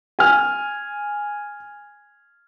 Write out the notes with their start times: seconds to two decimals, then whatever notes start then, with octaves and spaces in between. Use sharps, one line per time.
0.19 G#5 F6